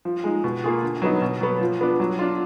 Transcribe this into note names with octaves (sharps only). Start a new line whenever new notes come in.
F3
G#3 D#4
B2
A#3 F4 G#4
D3
F#3 B3 D#4
B2
F#3 B3
F3
B3 D4
F#3
D4 F4